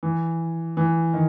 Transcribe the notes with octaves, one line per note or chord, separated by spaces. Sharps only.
E3
E3
D#3